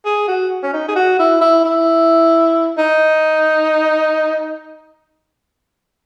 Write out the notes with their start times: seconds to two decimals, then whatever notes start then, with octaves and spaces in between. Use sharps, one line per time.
0.05 G#4
0.28 F#4
0.63 C#4
0.73 D#4
0.88 G#4
0.96 F#4
1.19 E4
1.41 E4
1.65 E4
2.78 D#4